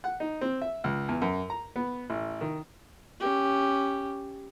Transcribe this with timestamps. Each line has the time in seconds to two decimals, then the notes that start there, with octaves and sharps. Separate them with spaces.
0.04 F#5
0.20 D#4
0.41 C4
0.62 E5
0.84 C#2
1.09 E2
1.22 F#2
1.50 A#5
1.76 B3
2.10 A1
2.41 D#3
3.20 C#4 G4